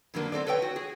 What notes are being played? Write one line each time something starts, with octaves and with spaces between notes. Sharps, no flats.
F2 D3 F#3 A#3 D4
B3 C4 A4 D5
A4 B4 C#5 D5 G5
F#4
G#4